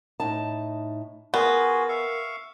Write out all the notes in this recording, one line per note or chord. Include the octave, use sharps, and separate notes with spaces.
A2 D#4 A5
B3 F4 F#4 G#4 A#4
E5 F5 C#6